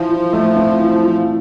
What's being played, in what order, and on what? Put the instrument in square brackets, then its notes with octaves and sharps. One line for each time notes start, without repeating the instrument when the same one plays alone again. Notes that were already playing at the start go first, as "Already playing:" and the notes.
Already playing: [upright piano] E3 [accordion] F3
[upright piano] F4
A3
C4
E3
F4